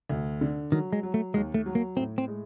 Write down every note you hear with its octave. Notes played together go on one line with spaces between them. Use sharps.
D2
D3
D#3 F#3
G#3
F#3
A3
D#2 G#3
A3
F#3
A#3
A2 C4
C4
G#3